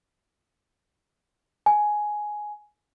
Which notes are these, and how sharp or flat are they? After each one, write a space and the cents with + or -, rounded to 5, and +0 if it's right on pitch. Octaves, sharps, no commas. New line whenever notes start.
G#5 +10